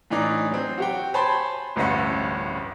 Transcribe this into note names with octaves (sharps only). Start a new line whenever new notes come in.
A2 E3 D4 D#4
F#3 C4
F#4 G4 G5
C5 C#5 G#5 A5 B5 C6
D1 A1 G2 C#4 E5 F#5